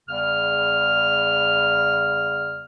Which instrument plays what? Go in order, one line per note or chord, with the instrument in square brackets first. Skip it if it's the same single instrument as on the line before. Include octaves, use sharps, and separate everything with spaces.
[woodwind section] E2 C#3 G3 F6